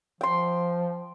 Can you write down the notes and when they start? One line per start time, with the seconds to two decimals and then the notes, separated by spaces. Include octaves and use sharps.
0.21 F3 G5 C6